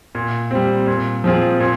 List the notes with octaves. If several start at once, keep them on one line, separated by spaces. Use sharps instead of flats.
A#2
G3 C4
A#2
F3 C4 F4 G#4
A#2